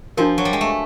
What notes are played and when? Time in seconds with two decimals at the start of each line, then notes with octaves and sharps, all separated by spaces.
0.17 F3 D4 F#4 A#4
0.38 F#3
0.45 G3
0.53 G#3
0.61 A3